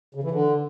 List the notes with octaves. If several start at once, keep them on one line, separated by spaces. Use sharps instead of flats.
C#3
E3
D3